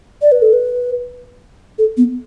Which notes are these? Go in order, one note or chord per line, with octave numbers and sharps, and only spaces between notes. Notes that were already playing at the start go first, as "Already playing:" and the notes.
D5
B4
A4
B4
A4
B3